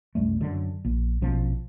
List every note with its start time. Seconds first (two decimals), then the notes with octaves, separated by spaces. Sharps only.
0.15 C2 F#2 G3 A3
0.41 F#2 D3
0.85 A#1
1.22 A#1 B2 F3 C#4